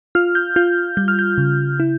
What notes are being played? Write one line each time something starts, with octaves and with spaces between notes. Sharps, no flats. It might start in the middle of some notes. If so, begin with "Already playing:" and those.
F4 F6
G6
F4 G6
G3 G6
F6
G6
C#3
E4